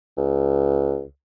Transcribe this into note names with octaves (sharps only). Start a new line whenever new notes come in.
C#2